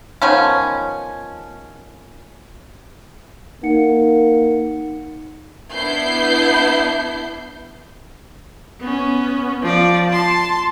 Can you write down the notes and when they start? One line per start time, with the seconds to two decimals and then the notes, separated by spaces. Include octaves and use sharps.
0.22 D#3 F3 B3 C#4
3.63 A#3 D#4 F#5 C#7
5.73 B3 D4 E4 G6 C7
8.80 B3 C#4
9.62 F3 D5
10.09 A5 C6